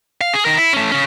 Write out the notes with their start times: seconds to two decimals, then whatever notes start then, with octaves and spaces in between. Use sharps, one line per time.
0.21 F5
0.34 G#4
0.45 D#3 A#4
0.57 E4
0.73 A3 C#4
0.92 C#3 C#4